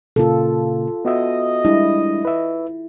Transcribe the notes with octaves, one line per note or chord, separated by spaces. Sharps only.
A#2 C#3 A#3 F4 A4
B3 F#4 D#5 E5
G3 G#3 D4 E4
B4 E5